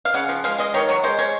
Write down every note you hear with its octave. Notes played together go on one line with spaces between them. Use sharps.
F5
C#3 F#5
F3
G#3 F5
G#3 D#5
D#3 C#5
F#3 C#5
G#3 C5
G#3 C#5